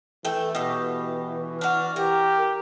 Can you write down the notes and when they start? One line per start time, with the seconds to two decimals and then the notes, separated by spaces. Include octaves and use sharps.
0.25 E3 A3 G5
0.55 B2 G4
1.61 D4 F#4 F6
1.96 G4 A#4